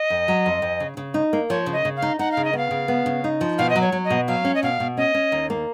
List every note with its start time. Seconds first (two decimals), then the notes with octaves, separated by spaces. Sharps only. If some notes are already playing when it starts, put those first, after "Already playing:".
Already playing: D#5
0.10 F2
0.28 F#3
0.46 F2
0.62 F2
0.80 C#3
0.97 C#3
1.14 D#4
1.33 A#3
1.50 F3 C#5
1.66 C#3
1.73 D#5
1.85 C#3
1.96 F5
2.02 D#4
2.19 D#4 F#5
2.32 F5
2.37 C#3
2.45 D#5
2.53 B3 F5
2.71 C#3
2.88 B3
3.06 C#3
3.24 D#4
3.41 F3
3.58 B2 F5
3.70 D#5
3.76 F#3
3.81 C#5
3.92 F#3
4.05 D#5
4.10 B2
4.27 F#3 F5
4.45 C#4
4.55 D#5
4.63 B2 F5
4.80 B2
4.97 C#4 D#5
5.14 C#4
5.32 D#2
5.50 A#3